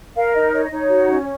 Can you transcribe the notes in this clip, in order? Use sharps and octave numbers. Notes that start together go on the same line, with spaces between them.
A#4 F5
D#4 D#5
C#5 D#5
D#5
D#4 C#5
F#4
C#4